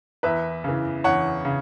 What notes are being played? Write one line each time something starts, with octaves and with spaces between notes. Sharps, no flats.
E2 B4 E5
C#3 E3
E2 C#5 F#5
C#3